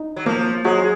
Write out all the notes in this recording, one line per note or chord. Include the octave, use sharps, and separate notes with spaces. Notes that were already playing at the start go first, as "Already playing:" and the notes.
Already playing: D#4
F#3
F3 A#3
F#3 G#3